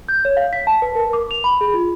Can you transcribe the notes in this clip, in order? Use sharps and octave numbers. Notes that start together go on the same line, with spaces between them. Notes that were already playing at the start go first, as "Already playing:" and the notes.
G6
C#5
F5
B6
A5
B4
A#4
D6
F7
B5
G#4
F4